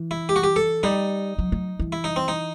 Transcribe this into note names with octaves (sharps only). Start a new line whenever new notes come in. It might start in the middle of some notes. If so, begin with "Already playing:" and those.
Already playing: E3
E4
G4
F#4
G4
A4
G3 D#4
F#3
F#3
E3
E4
D#4
C4
D#4